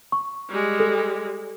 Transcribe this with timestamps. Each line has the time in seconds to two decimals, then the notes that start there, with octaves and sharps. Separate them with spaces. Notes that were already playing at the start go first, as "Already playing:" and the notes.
0.12 C#6
0.50 G3 G#3
0.80 A4